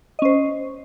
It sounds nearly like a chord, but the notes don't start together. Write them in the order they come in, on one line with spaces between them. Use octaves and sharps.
D#5 C#4 C5